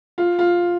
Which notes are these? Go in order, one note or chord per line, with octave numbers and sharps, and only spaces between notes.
F4
F4